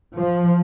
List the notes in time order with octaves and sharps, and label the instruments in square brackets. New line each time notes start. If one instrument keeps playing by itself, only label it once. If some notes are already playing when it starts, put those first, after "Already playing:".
[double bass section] F3